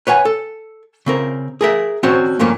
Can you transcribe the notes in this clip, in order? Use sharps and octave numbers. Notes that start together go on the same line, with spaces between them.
B4 C#5 F#5 G#5
A4
C#3 C4 A#4
G#4 A#4 E5
C4 C#4 F#4 C5 D5
G2 A#2 F3 A#3 C#4